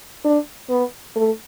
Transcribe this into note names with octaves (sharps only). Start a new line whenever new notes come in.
D4
B3
A3